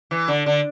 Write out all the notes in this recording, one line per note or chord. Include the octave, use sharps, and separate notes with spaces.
E3
D3
D3